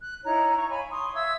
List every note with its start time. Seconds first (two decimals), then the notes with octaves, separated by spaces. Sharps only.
0.01 F#6
0.24 D#4 E4 C#5 A#5
0.56 A#5 C#6
0.69 C#5 F5 G#5 B5
0.89 C6 C#6 D#6
1.15 E5 F5 E6 G#6